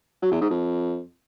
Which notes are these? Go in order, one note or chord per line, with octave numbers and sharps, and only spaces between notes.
F#3
E2
G#2
F2